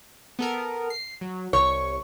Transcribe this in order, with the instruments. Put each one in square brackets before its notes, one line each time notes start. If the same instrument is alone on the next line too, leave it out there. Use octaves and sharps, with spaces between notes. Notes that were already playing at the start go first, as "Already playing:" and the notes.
[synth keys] B3 A4 A#4
C7
F#3
[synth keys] C2 C#6 [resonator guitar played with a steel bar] C#5